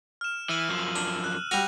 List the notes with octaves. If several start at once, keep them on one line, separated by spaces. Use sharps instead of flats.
F6 E7
E3 E6 D#7 F#7
F#2 F3
D4
F#6
G3 F#4 A#6 D#7 F7